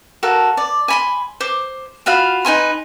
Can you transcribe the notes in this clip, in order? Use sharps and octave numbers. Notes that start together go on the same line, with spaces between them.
F#4 A4 A#4 F5
D5
G#5 B5 C6
C5 D6
F4 F#4 F5 B5
D#4 B4 G#5 C6